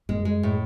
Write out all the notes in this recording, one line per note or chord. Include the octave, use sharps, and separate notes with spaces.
F#2 G#3
G#3
A2